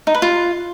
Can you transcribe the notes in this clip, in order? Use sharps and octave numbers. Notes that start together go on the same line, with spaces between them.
D#4
B4
F4